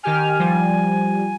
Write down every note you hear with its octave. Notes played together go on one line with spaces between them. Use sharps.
D#3 G4 G#5 F6
F3 G3